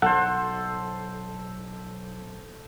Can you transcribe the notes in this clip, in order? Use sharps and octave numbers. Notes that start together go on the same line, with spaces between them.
B1 A4 C5 F#5